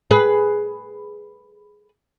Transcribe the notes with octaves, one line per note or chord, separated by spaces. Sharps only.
G#4 B4